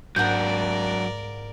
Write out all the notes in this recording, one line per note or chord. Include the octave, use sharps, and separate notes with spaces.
G#2 F#3 A#3 D4 A#4 D5 F#5 G6